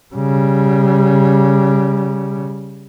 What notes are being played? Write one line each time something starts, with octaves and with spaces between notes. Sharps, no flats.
C#3 G3